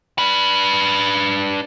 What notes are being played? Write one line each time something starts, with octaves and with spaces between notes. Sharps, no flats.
D4 B4